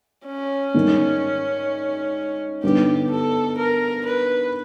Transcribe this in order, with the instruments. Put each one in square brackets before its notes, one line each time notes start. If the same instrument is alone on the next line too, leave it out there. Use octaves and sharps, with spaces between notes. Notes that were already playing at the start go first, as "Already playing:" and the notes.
[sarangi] C#4
[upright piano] G#2 D#3 G3
[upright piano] G2 D3 G3 B3 D#4 [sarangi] G4
[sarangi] A4
A#4
B4